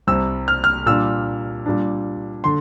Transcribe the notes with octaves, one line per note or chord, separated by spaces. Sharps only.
C2 C3 G3 C4 E6
F6
F6
A#2 G3 D4 E6
A#2 G3 D4
D3 C6